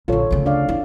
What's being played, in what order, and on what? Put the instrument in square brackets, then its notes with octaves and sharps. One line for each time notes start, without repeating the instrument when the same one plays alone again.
[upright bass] A#1 D3 [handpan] F4 A4 C#5
[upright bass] D2 C#3
[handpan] D4 D5 F5
[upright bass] E4